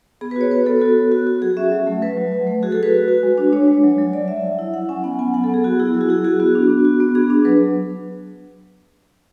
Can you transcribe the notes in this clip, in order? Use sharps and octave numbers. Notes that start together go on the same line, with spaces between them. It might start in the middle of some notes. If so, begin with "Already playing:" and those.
B3 G#4
B4
F#4 C#5
F#4 B4
B3 A4
F#4 A4
B3
F#4
F#4
F#3 G#4
C#4 E5
F#3
A3
F#3 B4
F#3
F#3
A3
F#4 G#4
A4
F#4
B4
F#4
F#4
G#3
D4
D4 C#5
G#3
F#3
F#3
F#3 D5
F#3 E5
F#3
E4
F#3 F#5
C#4 G#5
B3 F#5
B3 G#5
F#3 F#5
A4
B3 G#4
B3 F#4
E4 G#4
F#3
F#4
E4 G#4
F#4 G#4
B3 F#4
D4
B3
F#4
B3
D4 G#4
D4
F#3 B4